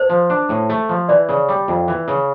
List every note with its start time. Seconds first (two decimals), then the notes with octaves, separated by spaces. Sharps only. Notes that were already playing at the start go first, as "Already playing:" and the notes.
Already playing: C5
0.10 F3
0.30 D4
0.49 A2
0.70 A3
0.89 F3
1.09 E3 D5
1.29 C#3
1.49 G3
1.68 F2
1.88 E3
2.08 C#3